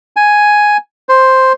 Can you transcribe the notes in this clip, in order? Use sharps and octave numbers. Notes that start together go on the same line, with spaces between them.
G#5
C5